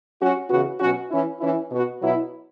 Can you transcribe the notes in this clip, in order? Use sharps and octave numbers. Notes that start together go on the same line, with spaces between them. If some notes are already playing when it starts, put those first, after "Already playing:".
F#3 C#4 F#4
C#3 E3 B3 F#4
B2 F#3 C#4 F#4
E3 C#4 E4
E3 C#4 E4
B2 B3 F#4
B2 F#3 B3 E4